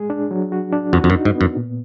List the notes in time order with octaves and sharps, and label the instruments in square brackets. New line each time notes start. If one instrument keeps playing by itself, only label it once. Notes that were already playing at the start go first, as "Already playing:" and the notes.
Already playing: [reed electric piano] G#3 G#4
D4
F#3
F#4
D4
[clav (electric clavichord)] F2 [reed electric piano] F#4
[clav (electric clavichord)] F2
F#2
[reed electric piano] D#4
[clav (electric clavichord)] G#2
[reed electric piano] B3
[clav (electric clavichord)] F#2
[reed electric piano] A#2